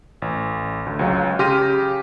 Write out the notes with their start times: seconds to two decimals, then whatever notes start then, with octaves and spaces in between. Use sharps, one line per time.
0.22 A1
0.86 D2
0.99 C#2 F#3 F5
1.39 C#3 G4 C6 F6 A#6 D#7